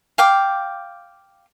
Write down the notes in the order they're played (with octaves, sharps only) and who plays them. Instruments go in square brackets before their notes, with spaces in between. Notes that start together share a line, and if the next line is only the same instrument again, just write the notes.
[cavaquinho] F5 G5 D6